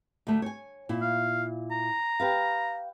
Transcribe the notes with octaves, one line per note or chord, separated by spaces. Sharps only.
D2 A3
C#5 G#5
A#2 E4
F5
A#5
G4 B4 F5